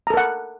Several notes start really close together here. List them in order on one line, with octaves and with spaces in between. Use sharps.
A#5 A4 A#4 F#5